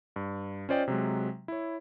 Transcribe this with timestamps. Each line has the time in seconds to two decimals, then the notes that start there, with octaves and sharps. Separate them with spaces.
0.16 G2
0.69 C#4 F4 C5 D5 D#5 G5
0.88 C3 F#3 G#3
1.48 E4 C#5